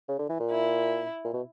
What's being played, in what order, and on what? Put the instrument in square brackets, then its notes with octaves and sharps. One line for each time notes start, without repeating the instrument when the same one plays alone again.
[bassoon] C#3
D3
E3
A#2
[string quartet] E4
[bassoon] A#2
B2